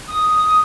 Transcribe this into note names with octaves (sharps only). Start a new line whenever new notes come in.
D#6